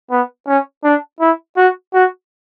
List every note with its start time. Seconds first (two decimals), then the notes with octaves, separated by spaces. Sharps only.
0.11 B3
0.47 C#4
0.84 D4
1.20 E4
1.57 F#4
1.94 F#4